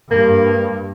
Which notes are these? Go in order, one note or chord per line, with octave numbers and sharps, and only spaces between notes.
G2 A#3